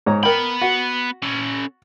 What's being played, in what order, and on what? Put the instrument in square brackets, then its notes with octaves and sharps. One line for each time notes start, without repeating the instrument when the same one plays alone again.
[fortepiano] G#2 C#5 A#5
[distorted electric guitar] B3 B5 [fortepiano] A#4 G5
[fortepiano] F#4
[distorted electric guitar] C#4 A4